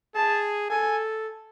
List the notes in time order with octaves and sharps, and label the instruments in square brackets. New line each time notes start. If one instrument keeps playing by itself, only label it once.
[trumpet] G#4 [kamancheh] A5
[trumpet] A4 [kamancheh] G#5